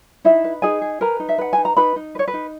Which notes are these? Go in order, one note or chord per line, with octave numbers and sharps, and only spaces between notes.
D#4 E4 E5
B4
D#4 G#4 G#5
G#4
A#4 B4 A#5
D#4
E5
B4 F#5
G#5
D#4
A#5
D#4 B4 B5
D#4
B4
C#5
B4
D#4